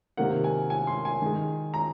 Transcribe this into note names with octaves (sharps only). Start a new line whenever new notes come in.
C3 D#3 A#3 F#5
G#5
G#5
C6
G#5
D#3 G#3
A#5